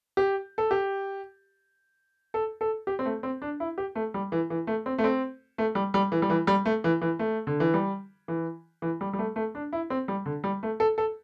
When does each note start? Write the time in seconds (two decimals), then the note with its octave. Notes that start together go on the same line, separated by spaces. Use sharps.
0.17 G4
0.58 A4
0.71 G4
2.34 A4
2.61 A4
2.87 G4
2.99 C4
3.06 A3
3.23 C4
3.42 D4
3.60 E4
3.78 G4
3.96 A3
4.14 G3
4.32 E3
4.50 E3
4.67 A3
4.86 C4
4.98 A3
5.04 C4
5.58 A3
5.75 G3
5.94 G3
6.12 E3
6.22 G3
6.30 E3
6.47 G3
6.65 A3
6.84 E3
7.02 E3
7.19 A3
7.47 D3
7.60 E3
7.74 G3
8.28 E3
8.82 E3
9.01 G3
9.13 G3
9.19 A3
9.36 A3
9.55 D4
9.73 E4
9.90 C4
10.08 G3
10.26 D3
10.44 G3
10.63 A3
10.80 A4
10.98 A4